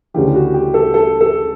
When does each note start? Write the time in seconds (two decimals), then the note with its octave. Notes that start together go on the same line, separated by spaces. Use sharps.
0.14 D2 C#3 E3 G4
0.34 F#4
0.54 G4
0.74 A4
0.94 A4
1.21 A4